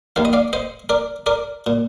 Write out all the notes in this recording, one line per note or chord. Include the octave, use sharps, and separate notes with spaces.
D#2 D#3 F5
D#5
D5 F5
C5 D#5
A#4 D5
A#4 D5
A#2